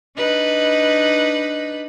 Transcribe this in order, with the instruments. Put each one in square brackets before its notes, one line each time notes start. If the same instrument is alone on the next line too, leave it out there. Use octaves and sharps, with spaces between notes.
[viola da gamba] D4 D#4 B4